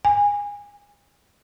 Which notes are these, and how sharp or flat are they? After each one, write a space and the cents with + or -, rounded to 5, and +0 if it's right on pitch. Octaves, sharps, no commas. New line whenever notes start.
G#5 -25